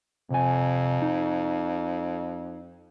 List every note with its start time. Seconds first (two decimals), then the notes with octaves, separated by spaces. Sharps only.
0.31 F2 C3 G#5
1.02 D#4